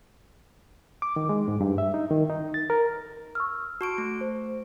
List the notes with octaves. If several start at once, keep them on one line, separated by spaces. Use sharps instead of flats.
D6
D#3
G#3
G#2
G2
E5
D#4
D#3
D#4
A6
A#4
C#6 E6 F6
F#4 A5 C#6 D7
A3
C5